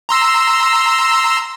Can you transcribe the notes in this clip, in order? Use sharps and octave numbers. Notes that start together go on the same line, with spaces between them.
A#5 C6 E6